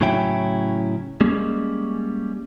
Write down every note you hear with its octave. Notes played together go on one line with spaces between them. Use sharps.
A2 C#3 F#3 C#4 E4 G5
G3 G#3 A#3 C#4